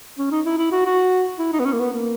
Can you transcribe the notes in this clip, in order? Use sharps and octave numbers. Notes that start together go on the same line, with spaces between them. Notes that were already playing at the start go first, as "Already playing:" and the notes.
C#4
D#4
E4
E4
F#4
F#4
E4
D#4
B3
C#4
A#3
B3
A#3